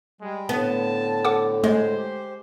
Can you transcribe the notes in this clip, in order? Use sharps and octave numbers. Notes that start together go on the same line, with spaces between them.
G3 G#3
A2 D3 B3 A5
A4 F#5 D6
G#3 A3 C5
G4